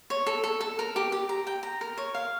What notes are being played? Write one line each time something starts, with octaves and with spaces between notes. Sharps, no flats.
C#5
A4
A4
A4
A#4
G4
G4
A#5
G5
A#5
A#4
C#5
F5